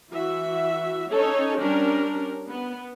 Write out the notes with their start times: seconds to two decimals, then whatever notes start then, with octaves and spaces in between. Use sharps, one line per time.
0.11 E3 F#4 E5
1.11 C#4 D#4 A4 C#5
1.60 G3 C#4 D4 A#4
2.50 B3